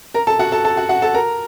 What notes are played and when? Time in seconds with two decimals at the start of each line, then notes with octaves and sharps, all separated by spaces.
0.14 A#4 A#5
0.27 A4 A5
0.39 F#4 F#5
0.52 A4 A5
0.65 A4 A5
0.77 F#4 F#5
0.89 F#4 F#5
1.02 A4 A5
1.14 A#4 A#5